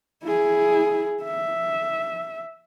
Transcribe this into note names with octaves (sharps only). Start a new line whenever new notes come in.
E4 G#4
E5